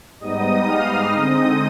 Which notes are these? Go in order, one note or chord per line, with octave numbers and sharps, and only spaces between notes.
G#2 G3 B3 D#4 D#5 D#6
F5 F6
D3 G#3 C4 D#4 D#5 D#6